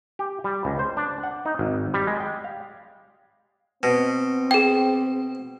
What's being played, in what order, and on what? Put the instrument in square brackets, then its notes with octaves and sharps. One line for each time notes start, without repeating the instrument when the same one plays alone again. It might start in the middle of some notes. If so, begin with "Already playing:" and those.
[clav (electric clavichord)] G4
G3
C#2
C5
D4
F#5
D#4
G#1
G3
G#3
G5
F5
[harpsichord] B2 [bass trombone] C4
[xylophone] G#4 G5